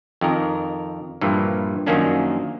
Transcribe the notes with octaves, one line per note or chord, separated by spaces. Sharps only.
F2 D#3 A#4
G2 A#2 E3 F3
F#2 D#3 F3 A#3 C#4 D4